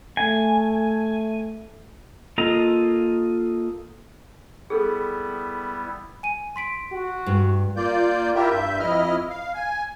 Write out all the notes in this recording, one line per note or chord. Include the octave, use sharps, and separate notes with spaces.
A3 G#5
A#3 F4 A4 D#5 A#5
G3 B3 E4 G#4 A4
G#5 D#7
C6 B6 D7
F#4
G2
A#3 F4 D5 G6
E4 F4 G4 A#4 E5 G5
G2 E5 G6
F2 E4 D#5 F6
F5
G#5